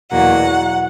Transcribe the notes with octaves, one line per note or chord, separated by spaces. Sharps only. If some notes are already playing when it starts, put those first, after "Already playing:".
E2 B2 F#3 A#3 F#5